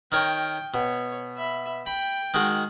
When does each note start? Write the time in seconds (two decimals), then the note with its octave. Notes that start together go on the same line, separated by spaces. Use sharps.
0.12 D#3 A#4 C#5 G5
0.74 B2 C#5
1.37 E5 B5
1.86 G5 B5
2.34 D#3 G#3 F#4